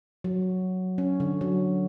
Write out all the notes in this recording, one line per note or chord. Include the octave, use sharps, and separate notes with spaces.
F#3
C#4
D3
F#3